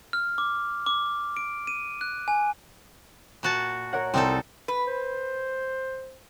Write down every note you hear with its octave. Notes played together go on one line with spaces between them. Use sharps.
F6
D6
D6
D7
D#7
F#6
G#5
A#2 F#4 A5
A#4 C#5 F#5
C2 C4 D#4 A4
B4
C5